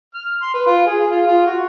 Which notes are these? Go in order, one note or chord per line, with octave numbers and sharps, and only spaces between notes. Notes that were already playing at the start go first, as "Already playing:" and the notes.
F6
C6
B4
F4
G#4
F4
F4
F#4